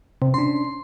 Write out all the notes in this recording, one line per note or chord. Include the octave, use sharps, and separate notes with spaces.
C3
C#4 D4 C6